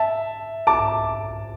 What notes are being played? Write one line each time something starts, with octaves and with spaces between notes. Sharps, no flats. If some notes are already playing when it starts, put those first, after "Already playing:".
Already playing: E5 A5
A5 D6